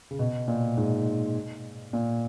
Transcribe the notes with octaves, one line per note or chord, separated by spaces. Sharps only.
C#3
B2
A#2
G#2
A#2